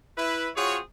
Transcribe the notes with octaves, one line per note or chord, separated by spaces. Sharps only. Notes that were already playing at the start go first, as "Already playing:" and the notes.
E4 B4
C4 F4 F#4 G#4 C#5